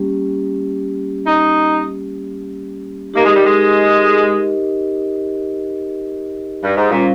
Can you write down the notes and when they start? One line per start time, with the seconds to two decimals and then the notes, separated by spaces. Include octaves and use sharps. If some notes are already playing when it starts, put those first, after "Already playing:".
Already playing: G3 A#3 C#4 G4
1.26 D#4
3.14 A#3 D#4 G4 A#4 D#5
3.25 G#3
3.35 G3
3.45 G#3
6.64 G2
6.77 G#2
6.91 A#2 G3 C#4 F4 C5 F5